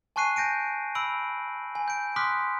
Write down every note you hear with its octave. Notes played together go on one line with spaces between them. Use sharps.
G#5 A5 C#6 F#6 C7 D#7
G#5 G6 A#6 D7 D#7
B5 E6 D7 F#7
G#5
G6 D7
C6 D6 D#6 F6 F#6 B6